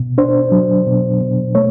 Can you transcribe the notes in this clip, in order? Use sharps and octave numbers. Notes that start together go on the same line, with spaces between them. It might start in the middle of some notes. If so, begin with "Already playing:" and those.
Already playing: B2
D4 C5
F#3
B2
B2
A3 C#5